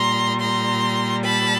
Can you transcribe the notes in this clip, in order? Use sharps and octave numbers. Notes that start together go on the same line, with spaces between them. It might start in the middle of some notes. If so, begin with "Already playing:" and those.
Already playing: A#2 G3 A#5 C6
A#5 C6
A5 B5